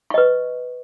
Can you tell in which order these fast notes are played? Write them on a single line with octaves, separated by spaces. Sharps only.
C#6 D#5 B4